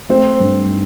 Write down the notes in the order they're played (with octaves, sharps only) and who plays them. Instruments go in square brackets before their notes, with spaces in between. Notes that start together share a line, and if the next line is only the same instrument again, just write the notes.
[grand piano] A3 [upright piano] C4
[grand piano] G2
D#4